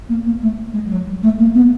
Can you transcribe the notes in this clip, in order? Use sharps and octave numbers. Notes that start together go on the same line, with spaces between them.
A#3
A#3
A3
G#3
G3
F#3
G3
A3
A#3
B3